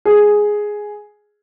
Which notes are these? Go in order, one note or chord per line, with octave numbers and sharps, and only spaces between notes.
G#4